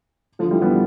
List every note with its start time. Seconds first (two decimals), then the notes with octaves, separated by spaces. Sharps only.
0.39 D3 F3
0.51 E3 G3
0.62 G3 B3